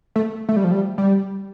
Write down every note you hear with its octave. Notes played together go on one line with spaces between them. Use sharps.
A3
A3
G3
F3
G3
G3